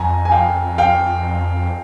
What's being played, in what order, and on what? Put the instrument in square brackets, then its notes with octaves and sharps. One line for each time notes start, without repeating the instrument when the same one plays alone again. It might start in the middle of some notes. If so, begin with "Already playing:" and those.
Already playing: [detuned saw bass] F2 [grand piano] G#5 A#5
[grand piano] G#5
F5 G5
F5 G5